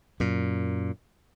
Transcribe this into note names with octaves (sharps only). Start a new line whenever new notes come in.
F#2 A#2